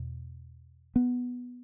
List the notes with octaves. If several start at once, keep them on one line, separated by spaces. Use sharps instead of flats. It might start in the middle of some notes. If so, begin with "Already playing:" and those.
Already playing: E2 B2
B3